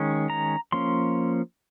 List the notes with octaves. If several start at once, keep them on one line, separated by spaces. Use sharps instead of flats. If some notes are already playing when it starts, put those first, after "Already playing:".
Already playing: D#3 G#3 C#4
A#5
F3 A#3 C#4 C6